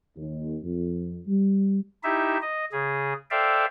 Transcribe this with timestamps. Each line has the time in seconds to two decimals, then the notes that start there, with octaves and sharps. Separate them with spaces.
0.17 D#2
0.64 F2
1.27 G3
2.04 D#4 E4 G4 E5
2.42 D#5
2.72 C#3 G#4
3.31 A4 C5 D5 E5 F5 G5